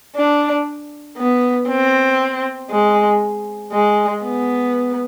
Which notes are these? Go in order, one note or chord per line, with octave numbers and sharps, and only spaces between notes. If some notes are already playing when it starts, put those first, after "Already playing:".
D4
B3
C4
G#3
G#3
B3